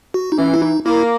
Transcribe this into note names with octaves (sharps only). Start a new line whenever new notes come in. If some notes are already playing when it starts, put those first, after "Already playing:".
F#4
D#4
E3 C#4
E4
D#4
A#3 E4